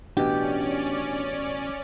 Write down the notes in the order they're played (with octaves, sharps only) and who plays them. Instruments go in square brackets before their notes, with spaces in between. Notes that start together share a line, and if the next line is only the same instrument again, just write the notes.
[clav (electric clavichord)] A1 B2 [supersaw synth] C#4 D5 [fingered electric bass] D4 [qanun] G4